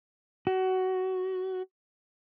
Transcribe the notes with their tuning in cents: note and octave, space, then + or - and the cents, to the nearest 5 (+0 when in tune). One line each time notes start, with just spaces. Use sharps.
F#4 +15